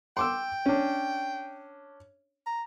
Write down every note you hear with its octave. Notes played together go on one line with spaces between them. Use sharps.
G5 C6 D6 E6
C#4 D4
A#5